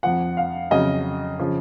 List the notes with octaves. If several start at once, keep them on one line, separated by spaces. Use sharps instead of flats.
F2 F3 F#5
F5
F2 C#3 F#3 D#5
C#3 F3